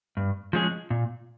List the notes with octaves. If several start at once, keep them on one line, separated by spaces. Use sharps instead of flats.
G2
F3 G#3 C#4 G#4
A#2